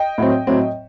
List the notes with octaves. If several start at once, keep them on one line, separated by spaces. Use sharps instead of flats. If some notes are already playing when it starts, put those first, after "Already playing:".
Already playing: D#5 G5
A2 F#3 C4
A2 F#3 C4